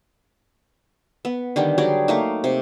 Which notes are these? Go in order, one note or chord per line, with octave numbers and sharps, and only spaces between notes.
B3
D3 D#3 G3
F#3 G3 G#4 D5
A3 A#3 D#4
C3